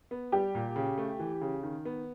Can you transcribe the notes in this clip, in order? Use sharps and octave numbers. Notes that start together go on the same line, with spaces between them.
B3
G3 G4
A#2
C#3
A3
E3
C#3
D#3
B3